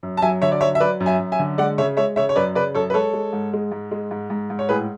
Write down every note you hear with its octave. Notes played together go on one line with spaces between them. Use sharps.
F#2
A5
F#3 E5 G#5
D3 C#5 E5
D5
F#3 C#5 E5
E5
F#3 B4 D5
F#2
E5 G#5
F#2
E5 G#5
D3
G#3 D5 F#5
C#3 C#5 E5
G#3 C#5 E5
C#3 C#5 E5
C#5
F#2 B4 D5
C#3 B4 D5
F#2 A4 C#5
B4
G#3 A4 C#5
G#3
G#2
G#3
G#2
G#3
G#2
G#2
G#2
C#5
A2 G#4 B4